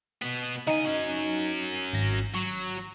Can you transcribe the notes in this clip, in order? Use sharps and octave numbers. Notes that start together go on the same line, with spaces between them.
B2 B3
C#3 D#4 G#5
F#3 C#4
G#1 A#6
F#3 C#6